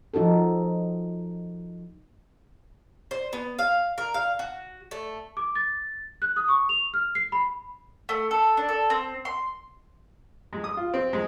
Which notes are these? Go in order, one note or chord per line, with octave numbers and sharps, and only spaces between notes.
F3 D#4 F#4 A4
C5
B3
F5
A#4
F5
F#4
A3
D6
A6
F#6
D#6
C#6
F7
F6
C7
B5
A3
A4
D4
A4
C4
C6
G#3
D#6
F4
C4
G#3